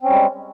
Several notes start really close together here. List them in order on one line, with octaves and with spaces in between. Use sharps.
C4 C#4 G3 G#3